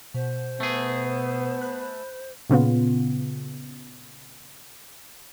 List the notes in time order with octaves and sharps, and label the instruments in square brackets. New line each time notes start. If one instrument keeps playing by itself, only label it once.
[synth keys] B2 [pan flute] C5
[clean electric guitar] A3 G#4 [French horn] B3
[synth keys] B5 F#6
[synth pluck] A#2 C#3 B3 F4